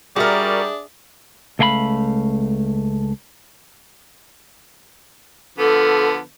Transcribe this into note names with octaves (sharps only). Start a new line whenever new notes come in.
G3 D4 F#4 G#4 A#4 E5
C#2 A3 F5 G5 B5
D3 F3 B3 A4